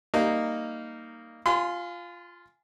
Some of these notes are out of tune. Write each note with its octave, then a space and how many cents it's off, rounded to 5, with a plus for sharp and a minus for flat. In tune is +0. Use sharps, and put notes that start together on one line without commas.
G3 +0 A#3 -15 D#4 -5
F4 +0 G#5 +0 C6 -40